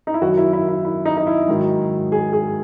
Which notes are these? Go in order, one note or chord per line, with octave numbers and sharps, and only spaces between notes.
D#4
E4
F#2 D#3 F#3 F#4
E4
E4
E4
E4
D#4
D#4
E4
G#2 D#3 F#3
G#4
G#4